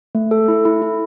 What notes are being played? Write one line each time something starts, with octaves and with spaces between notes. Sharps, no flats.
A3
A4
E4
E4
E4